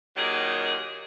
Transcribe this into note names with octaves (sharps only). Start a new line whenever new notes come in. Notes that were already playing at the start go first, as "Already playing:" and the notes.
A#2 D#3 F#3 G4 G#4